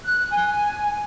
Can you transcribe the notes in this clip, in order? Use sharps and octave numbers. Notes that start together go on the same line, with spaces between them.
F#6
G#5